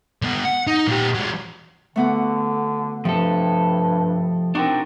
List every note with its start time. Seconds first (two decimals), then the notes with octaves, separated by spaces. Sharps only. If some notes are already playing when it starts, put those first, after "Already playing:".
0.22 D3 B3
0.45 F#5
0.67 D#4
0.87 A#2 G4
1.14 F#3 G#3
1.96 D3 A3 B3 F#4
3.05 G2 C3 F3 A4
4.55 C4 D4 D#4 F#4 A#4